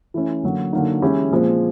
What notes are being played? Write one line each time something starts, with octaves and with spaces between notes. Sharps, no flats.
E3 A3 C#4
D3 F#3 A#3
D3 F#3 A#3 D#4
E3 G#3 C#4 E4 G4
A#2 F3 G#3 C4